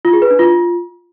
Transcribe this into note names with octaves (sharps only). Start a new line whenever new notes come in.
F4
G#4
B4
D4
F4